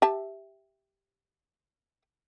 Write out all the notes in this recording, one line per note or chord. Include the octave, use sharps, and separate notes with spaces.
G4 E5 A5